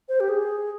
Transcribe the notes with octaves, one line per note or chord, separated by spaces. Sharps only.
C5
G4
G#4